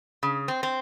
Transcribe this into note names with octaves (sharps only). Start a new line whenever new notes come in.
C#3
C4
C4